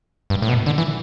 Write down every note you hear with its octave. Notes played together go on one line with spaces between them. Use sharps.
G2
A2
B2
D3
E3